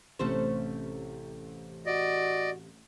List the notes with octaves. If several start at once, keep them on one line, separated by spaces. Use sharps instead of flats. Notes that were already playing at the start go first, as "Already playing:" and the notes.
A1 C3 A3 C#4 C5
F#4 D5 D#5